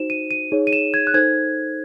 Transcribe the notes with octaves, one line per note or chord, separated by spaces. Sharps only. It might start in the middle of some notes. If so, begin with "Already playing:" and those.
Already playing: D#4 F#4 C5 E7
D#7
D#7
D#4 G#4 C#5
D#7
E7
G#6
F#6
D#4 A4 C5 G#6